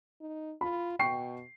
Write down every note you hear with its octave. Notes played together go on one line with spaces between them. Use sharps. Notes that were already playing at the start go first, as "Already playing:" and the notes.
D#4
F4 B5
B2 G5 C#6 C7